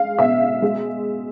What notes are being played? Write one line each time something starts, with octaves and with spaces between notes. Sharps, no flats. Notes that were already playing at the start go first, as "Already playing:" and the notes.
Already playing: G#3 F5
B2 E5
G#3